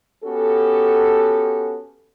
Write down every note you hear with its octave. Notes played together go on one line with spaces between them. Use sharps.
B3 C#4 F#4 G4 A4